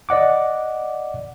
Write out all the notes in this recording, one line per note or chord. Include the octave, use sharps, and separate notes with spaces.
D5 D#5 F#5 D6